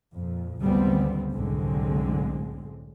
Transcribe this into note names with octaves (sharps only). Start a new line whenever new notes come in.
F2 A#2
G#1 D2 C#3 G3 B3 C4
C2 F#2 A2 D3 G#3 C4